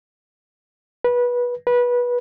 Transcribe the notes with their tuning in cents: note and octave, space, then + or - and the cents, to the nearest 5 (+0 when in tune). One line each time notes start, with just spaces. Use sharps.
B4 -20
B4 -20